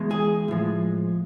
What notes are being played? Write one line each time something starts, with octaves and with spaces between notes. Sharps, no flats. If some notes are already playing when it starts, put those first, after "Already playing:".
Already playing: E2 B2 G#3
G#4
A2 F3 G#3